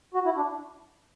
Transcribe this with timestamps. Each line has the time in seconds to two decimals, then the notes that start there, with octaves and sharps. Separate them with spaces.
0.14 F#4
0.25 E4
0.36 D4